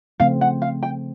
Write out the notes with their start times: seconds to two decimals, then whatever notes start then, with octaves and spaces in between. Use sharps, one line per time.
0.20 C#3 F3 A3 C4 F5
0.41 F#5
0.62 F5
0.83 G5